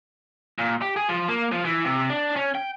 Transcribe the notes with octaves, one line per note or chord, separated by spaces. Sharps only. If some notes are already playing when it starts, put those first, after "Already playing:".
A#2
G4
G#4
F3
A#3
F3
E3
C3
D4
C#4
G5